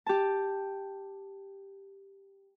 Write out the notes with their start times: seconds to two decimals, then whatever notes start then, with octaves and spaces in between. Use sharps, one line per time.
0.06 G4 A5